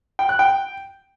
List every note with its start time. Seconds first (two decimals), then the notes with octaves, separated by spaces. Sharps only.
0.19 G5
0.29 F#6
0.39 G5